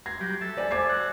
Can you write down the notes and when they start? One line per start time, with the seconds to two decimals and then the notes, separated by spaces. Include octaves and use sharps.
0.06 A#5 C6 G#6
0.21 F#3 G3 G4
0.41 A4 E5 A5
0.57 C5 D5 G#5
0.71 D6 G#6 C7
0.89 F#4 F#5